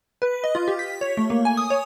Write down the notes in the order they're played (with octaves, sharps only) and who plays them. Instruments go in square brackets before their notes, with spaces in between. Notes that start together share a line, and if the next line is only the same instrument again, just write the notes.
[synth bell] B4
D#5
F4
G4
B6
C#5
A3
A#3
G#5
D#6
C#5